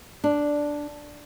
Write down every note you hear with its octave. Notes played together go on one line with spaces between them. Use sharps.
D4